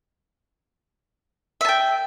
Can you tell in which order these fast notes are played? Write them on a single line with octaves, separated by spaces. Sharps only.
E5 A5 G5